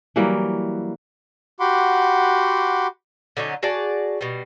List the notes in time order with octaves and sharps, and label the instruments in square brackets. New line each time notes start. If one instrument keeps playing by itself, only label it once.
[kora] E3 F#3 G3 A#3
[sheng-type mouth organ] F#4 G4 F#5 B5 C6 D6
[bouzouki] D3 F#3 C#4 D#4
F#4 G#4 D5 A5
B2 G3